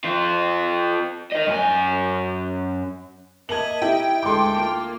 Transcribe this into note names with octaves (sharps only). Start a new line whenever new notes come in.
C4 F4
A#4 D#5
F#2 G#5
A#3 D#5 E5 A5 G#6 F#7
D#4 E4 G4 G5
D2 G#3 A4 C6 D6
A#3 F4